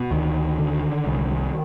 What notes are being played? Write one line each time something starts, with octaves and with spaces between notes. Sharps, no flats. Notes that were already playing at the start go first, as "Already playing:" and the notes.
Already playing: B2
D2 D#3
D3
C2